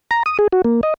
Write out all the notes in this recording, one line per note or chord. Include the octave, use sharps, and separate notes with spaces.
A#5
D#6
G#4
F#4
A#3
D#5